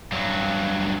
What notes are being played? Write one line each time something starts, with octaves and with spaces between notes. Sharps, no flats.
G2 F#3